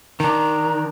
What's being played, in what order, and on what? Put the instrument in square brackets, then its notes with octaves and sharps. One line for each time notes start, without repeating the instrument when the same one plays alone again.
[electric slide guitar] D#3 D4 [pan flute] A#5